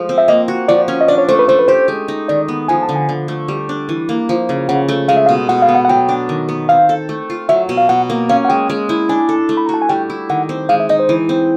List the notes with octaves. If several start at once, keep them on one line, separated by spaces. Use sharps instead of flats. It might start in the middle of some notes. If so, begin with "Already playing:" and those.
Already playing: F3 G#3 A3
C4
E5
A#3 D#5
F#4
F3 D5
C#4
D#5
D4 D5
C#5
A3 C5
B4
A3 C5
B4
G4 C5
G#3
D#4
D#3 D5
B3
F3 G#5
A5
D3
G#5
D3
A3
G3
D4
E3
A#3
F3
C#3
C#3 F#5
A3
G#3 F5
E5
F5
B2
B2 F#5
F5
B3
F#5
F#5
F#3 G5
D4
D#3
B3
C4 F5
A4
A3
F4
F#3 E5
B2
F5
B2 F#5
A#3
C#4 F5
F#5
G#3 G5
G#3
E4
D4 G#5
A4
A3
B5
F#4 A#5
A5
G#5
G3 G5
E4
D#3 F#5
C4
G#3 F5
E5
D#4 D#5
C5
E3
C4